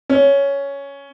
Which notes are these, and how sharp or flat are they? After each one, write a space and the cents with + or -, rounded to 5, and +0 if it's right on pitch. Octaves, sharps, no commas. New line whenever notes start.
C#4 +10